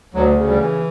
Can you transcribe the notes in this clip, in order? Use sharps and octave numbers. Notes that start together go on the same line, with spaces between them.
D2 F#3
C#3
G3
E3